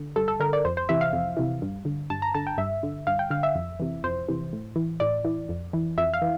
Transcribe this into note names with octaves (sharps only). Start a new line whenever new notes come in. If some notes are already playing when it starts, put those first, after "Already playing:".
Already playing: D3
G2 A4
A4
D3 A#4
D5
F2 C5
C5
C3 E3 E5
F5
F2
C3 E3
G2
D3
G2 A5
A#5
D3 A5
G5
G2 E5
D3
G2 F5
G5
D3 F5
E5
F2
C3 E3
F2 C5
C3 E3
A2
E3
A2 D5
E3
F2
E3
F2 E5
F5
E3